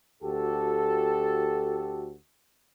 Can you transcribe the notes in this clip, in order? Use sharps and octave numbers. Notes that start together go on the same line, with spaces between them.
D2 F#4 G4 A4